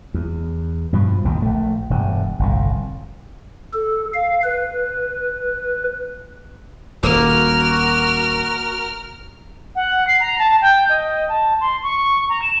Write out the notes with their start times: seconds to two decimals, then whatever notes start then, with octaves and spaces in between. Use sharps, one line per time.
0.14 E2
0.93 G2 B2 F3
1.24 A#1 D#2 G#2 B2
1.42 A#1 A3
1.90 E1 G2
2.39 G1 C2 A2
3.73 A4
4.14 F5
4.44 B4
7.03 D#1 A#3 F#4 A#4 F6
9.75 F#5
10.07 C7
10.20 A#5
10.38 A5
10.61 G5
10.89 D#5
11.28 A5
11.60 C6
11.83 C#6
12.29 A#5
12.42 E7